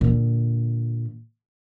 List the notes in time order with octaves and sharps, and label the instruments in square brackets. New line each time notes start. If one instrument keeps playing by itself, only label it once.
[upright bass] A#2 D3